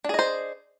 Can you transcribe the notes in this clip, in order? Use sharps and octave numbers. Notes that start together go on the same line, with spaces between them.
D4 G#4 C5 D#5